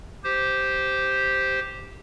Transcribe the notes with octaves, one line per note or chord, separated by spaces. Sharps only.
G4 C5